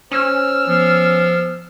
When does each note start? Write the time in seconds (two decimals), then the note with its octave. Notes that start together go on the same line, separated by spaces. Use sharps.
0.11 C#4 C5 E6 F6
0.67 F3 B3